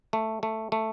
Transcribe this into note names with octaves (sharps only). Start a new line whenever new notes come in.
A3
A3
A3